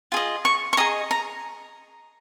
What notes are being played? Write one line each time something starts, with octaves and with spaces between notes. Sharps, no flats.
F4 G#4 D#5
C#6
C#6
G#4 D#5 A#5
A#5